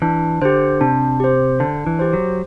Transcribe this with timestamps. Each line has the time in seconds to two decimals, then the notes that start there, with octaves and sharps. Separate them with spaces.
0.02 E3 D4
0.42 D3 G4 C5
0.81 C3 D4
1.20 G4 C5
1.60 D3 D4
1.87 E3
1.99 G4 C5
2.13 F#3